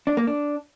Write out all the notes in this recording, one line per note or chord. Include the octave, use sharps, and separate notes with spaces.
D4
A#3
D4